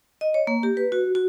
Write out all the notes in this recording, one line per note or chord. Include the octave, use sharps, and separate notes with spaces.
D#5
C#5
A#3
G4
B4
F#4
F#4